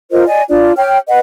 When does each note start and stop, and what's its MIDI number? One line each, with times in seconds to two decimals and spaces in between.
0.11 0.24 65
0.11 0.24 70
0.11 0.24 72
0.11 0.24 75
0.26 0.42 74
0.26 0.42 75
0.26 0.42 80
0.49 0.72 62
0.49 0.72 65
0.49 0.72 74
0.77 0.98 73
0.77 0.98 79
0.77 0.98 89
1.08 1.19 71
1.08 1.19 75
1.08 1.19 78